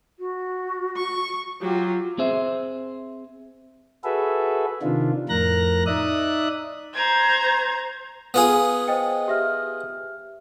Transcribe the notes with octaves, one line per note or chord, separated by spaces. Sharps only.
F#4
C#6
F#3 F4 G4
C4 G#4 C5 E5
F#4 G#4 A4 B4 E5
C3 D#3 D4 F4
F2 A2 A#4 A#5 F#6 A#6
D#4 D5 E5 D#6 F#6
C5 A#5 G#6
B3 F4 G#4
C5 D#5 G5
G4 E5 F6